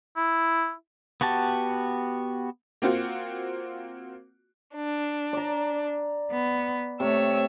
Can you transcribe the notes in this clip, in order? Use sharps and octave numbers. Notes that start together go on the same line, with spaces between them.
E4
B3 F#4 G4 A5
A#3 C4 F4 F#4
D4
D5 A#5
B3
C3 A3 C#5 E6